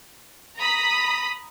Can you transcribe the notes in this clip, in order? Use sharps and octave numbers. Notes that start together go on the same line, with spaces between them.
A#5 B5 D#6 B6